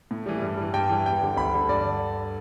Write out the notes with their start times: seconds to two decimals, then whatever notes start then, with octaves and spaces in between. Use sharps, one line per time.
0.11 A2
0.26 E3 G3
0.42 G2
0.57 E3 G3
0.74 G2 G5
0.89 E3 G3
1.06 E2 G5
1.22 D3 G3
1.37 D2 B5
1.53 D3 G3
1.69 G2 D5
1.85 D3